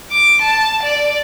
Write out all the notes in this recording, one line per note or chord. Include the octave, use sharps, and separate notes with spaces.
D6
A5
D5